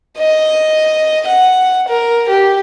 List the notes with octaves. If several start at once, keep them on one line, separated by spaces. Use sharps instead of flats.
D#5
F#5
A#4
G4